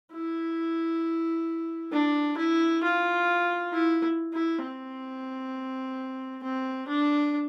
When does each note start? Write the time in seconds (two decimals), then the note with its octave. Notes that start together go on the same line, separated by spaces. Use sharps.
0.12 E4
1.92 D4
2.37 E4
2.83 F4
3.72 E4
4.33 E4
4.63 C4
6.43 C4
6.88 D4